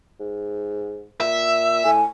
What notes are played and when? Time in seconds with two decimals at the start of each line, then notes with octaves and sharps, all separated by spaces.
0.20 G#2
1.20 A#2 E5
1.85 A2 G#5